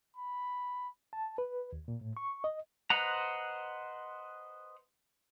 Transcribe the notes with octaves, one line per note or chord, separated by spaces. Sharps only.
B5
A5
B4
D#2
A#2
A2
C#6
D#5
B4 C5 D#5 F#5 A#5